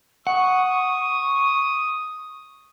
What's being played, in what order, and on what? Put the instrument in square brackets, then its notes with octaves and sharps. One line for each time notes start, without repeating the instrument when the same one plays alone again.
[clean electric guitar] F#5 [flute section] C#6 [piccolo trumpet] D#6